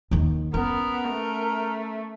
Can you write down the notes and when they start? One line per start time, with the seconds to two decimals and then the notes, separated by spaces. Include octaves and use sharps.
0.11 D#2 D#3
0.54 B3 C#4 A#4
1.10 A3